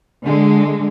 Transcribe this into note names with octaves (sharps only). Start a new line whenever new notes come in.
D3 G#3